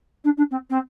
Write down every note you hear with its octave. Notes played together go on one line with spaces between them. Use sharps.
D4
D4
C4
C4